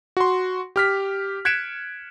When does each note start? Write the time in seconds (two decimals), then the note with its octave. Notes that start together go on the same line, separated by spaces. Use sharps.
0.17 F#4 C6
0.76 G4 F6 B6
1.45 F#6 G#6 B6 C#7 D7 E7